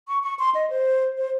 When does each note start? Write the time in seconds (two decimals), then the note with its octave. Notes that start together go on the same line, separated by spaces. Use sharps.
0.08 C#6
0.23 C#6
0.39 C6
0.55 D#5
0.70 C5
1.18 C5